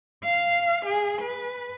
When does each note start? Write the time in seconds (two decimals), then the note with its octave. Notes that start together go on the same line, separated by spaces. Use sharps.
0.24 F5
0.86 G#4
1.22 B4